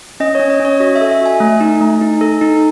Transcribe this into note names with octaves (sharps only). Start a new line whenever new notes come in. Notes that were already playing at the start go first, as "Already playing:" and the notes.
C#4 D#5
C#4 C#5
D#5
C#4
C#5
F#4 D#5
E5
A4
E5
F#4 G#5
A3
D#4
A3
D#4
A4
D#4